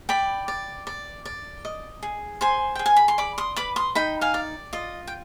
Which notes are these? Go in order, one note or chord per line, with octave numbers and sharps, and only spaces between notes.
D5 G5 B5
D5
D5
D5
D#5
G#4
C5 G#5 C6
G#4 G5
G#5
B5
C6
D5 B5 D6
C6 D#6
B4 B5 D6
C6 D#6
D#4 G5 B5
F5 G#5
D5
F4 D#5
G5